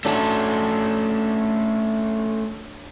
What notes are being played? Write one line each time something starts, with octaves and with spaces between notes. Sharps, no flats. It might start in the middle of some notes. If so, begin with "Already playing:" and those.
F#3 A3 C#4 D4